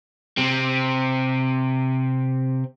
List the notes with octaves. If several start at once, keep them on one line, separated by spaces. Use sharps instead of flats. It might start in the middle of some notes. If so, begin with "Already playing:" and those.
C3 C4